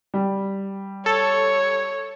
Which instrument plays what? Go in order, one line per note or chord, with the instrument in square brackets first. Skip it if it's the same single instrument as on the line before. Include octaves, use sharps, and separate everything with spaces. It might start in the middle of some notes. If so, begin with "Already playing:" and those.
[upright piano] G3
[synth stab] A4 [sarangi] C#5